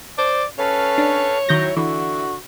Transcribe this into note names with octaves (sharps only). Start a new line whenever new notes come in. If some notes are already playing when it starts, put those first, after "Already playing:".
C5 D5
C#4 A4 B4 C#5 F5
D4
D#3 F#3 E4 G6 A#6
D3 E3 F#4